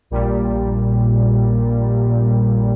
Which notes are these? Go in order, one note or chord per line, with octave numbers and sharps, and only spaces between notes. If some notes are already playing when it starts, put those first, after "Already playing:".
A#1 A#2 G3